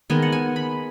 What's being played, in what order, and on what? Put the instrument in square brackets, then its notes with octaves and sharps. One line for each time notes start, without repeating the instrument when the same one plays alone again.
[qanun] D#3 G#3 B3 G#5
F#5
G#5
B5